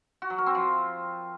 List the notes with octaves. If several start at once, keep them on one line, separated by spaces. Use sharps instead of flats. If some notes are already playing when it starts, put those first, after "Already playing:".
F#4
F#3
A#4
C4
F3